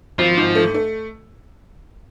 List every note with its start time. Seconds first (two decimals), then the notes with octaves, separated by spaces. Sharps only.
0.18 G#1 F3
0.37 G#2
0.55 A3
0.74 A3